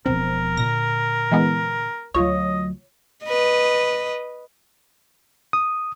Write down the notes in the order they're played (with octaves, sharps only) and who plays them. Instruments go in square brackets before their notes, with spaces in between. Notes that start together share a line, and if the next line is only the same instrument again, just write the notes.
[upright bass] E1 F3 [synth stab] C4 [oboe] A#4
[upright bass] A#2 D3 [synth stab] A#6
[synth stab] E3 G#3 B3
[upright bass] D2 F#3 [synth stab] F4 C#5 [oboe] D#5
[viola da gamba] B4 D#5
[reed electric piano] D#6